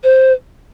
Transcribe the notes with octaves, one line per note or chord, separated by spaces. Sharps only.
C5